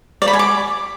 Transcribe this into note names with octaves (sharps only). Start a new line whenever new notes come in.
D5
B5
G#5
D6